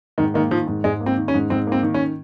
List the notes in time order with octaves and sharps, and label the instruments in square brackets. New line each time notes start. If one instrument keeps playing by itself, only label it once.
[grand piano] G#2 [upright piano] D#3
[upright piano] D#3 [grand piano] A#3
[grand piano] D#3 [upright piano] F3
[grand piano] G#2
[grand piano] G#2 [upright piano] G#3
[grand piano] A#3
[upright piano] C4
[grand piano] D#3
[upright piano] C#4
[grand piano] G#2
[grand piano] G#2 [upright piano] C4
[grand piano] A#3 [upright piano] C4
[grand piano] D#3
[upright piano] C#4